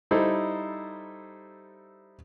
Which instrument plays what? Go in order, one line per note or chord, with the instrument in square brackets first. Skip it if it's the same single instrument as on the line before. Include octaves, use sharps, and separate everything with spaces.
[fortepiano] G3 D#4 E4 A4 C5